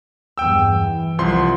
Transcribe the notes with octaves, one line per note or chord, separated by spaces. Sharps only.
E2 G2 G5 E6
E3
C2 F3 C6